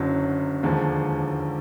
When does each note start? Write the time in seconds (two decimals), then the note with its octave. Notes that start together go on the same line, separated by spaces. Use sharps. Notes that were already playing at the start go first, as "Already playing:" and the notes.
Already playing: F#1 F#2 D3 F#3
0.63 E1 D#2 D3 F3 G#3